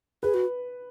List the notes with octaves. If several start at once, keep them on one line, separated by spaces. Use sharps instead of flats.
G#4 B4
F#4